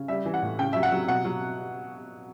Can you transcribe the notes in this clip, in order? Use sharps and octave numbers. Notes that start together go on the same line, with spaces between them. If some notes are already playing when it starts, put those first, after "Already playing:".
Already playing: C#3
G3 E5
E3
F#5
A2
C#3 G5
F#3 E5
F#5
F#3
B2 F#5
F#3